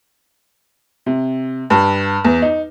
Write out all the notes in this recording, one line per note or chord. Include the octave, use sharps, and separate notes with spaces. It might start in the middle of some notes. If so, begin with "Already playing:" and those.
C3
G2
E2
D#4